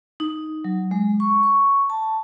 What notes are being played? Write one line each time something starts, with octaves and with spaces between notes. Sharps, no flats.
D#4
F#3
G#3
C#6
C#6
A5